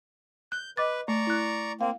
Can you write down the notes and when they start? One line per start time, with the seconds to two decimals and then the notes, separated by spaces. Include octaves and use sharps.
0.52 F#6 G6
0.77 B4 D#5 D6 A6
1.08 A3 D5 A#5 C#6
1.27 E4 F#6
1.81 A#3 C4 F5